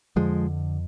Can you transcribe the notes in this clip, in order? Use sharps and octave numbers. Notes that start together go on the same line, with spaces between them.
F2 D3 F3 G#3